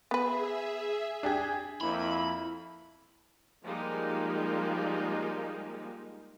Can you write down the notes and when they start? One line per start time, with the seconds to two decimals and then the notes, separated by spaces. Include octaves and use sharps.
0.11 B3 G#4 B4 E5
1.23 D4 G4 G#4
1.81 F2 A#3 E4 B5
3.63 F3 G3 G#3 A#3 D#4 F4